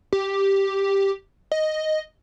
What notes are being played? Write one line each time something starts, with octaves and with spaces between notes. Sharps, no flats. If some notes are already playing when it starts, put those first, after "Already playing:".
G4
D#5